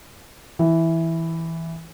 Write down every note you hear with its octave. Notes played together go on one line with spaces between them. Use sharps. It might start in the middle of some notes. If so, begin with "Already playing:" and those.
E3